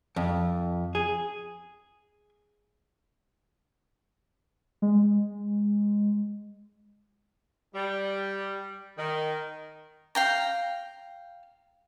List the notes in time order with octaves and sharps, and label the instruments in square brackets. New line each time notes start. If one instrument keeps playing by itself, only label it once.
[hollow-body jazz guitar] F2
G#4
[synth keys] G#3
[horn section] G3
D#3
[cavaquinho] F5 G5 A#5